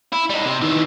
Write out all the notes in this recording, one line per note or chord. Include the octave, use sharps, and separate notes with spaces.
E4
G3 D#4
C3
D#3 E3